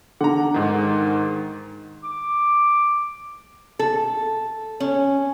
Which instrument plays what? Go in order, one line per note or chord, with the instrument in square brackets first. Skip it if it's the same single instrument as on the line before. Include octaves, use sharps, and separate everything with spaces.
[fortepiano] D3 [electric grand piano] F#5 A#5
[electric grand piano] G#2 D#3
[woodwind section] D6
[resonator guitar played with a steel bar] A4
C#4